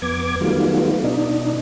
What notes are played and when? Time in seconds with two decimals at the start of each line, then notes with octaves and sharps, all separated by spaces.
0.02 F2 B3 D6 G#6
0.41 D#3 F#3 G3 A3 B3 F4
1.03 B2 D4 D#4